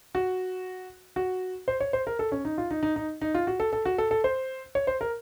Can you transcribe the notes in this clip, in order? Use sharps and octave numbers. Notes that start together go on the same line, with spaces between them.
F#4
F#4
C5
C#5
C5
A#4
A4
C#4
D#4
F4
D#4
D#4
D#4
D#4
F4
F#4
A4
A4
F#4
A4
A4
C5
C#5
C5
A#4